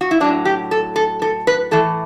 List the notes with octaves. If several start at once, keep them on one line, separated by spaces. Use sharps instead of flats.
F#4
E4
A2 F#3 D4
G4
A4
A4
A4
B4
A2 E3 A4